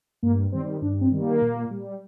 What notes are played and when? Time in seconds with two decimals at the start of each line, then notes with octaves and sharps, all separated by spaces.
0.23 G2 A#3
0.52 D#3 G3 C4
0.82 G2 D4
1.01 C4
1.12 D#3 G3
1.21 A#3
1.42 A#2
1.71 G3